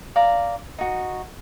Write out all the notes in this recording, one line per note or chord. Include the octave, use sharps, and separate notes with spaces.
D5 F5 A#5
D#4 F#4